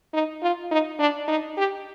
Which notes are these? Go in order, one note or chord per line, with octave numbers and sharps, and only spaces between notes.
D#4
F4
D#4
D4
D#4
G4